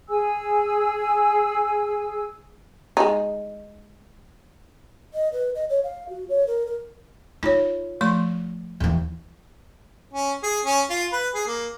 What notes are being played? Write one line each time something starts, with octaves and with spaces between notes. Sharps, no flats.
G#4 G#5 E6
G#3 D#4
D#5
B4
D#5
C#5
F5
F#4
C#5
A#4
A#4
D#4 F4 C#5
F3 A3 C6
D#2 E3
C#4
G#4
C#4
F4
B4
G#4
A#3